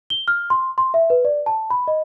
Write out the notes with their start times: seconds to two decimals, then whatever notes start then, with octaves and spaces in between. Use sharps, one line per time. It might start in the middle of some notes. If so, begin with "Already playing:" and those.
0.10 G7
0.28 F6
0.50 C6
0.78 C6
0.94 E5
1.10 B4
1.25 D5
1.46 A5
1.70 B5
1.88 D#5